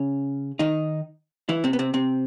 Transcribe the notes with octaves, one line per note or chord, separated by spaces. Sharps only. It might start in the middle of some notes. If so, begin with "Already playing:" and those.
Already playing: C#3 C#4
D#3 D#4
E3 E4
C3 C4
B3
C3 C4
C3 C4